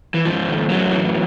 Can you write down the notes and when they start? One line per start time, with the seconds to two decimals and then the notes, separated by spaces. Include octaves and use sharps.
0.14 E3
0.25 G#2 F3
0.48 D#3
0.70 F#2 A2 F#3
0.91 E3